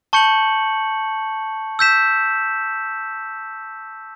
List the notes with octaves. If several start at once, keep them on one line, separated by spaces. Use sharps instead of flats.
A5 C#6 G6 C#7 F#7
E6 G6 B6 E7